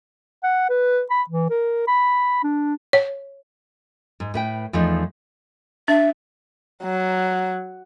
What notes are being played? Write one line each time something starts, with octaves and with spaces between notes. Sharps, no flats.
F#5
B4
B5
E3
A#4
B5
D4
C#5
G#2
A2 B4 G5
E2 F3 A3 D#4
D4 E5
F#3